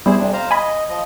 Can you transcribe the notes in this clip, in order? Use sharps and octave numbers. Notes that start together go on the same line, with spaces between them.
G3 B3 E4 G#4 C5
F2 C3 D4
C5 F5 A#5
D#5 G#5 B5
F3 D#5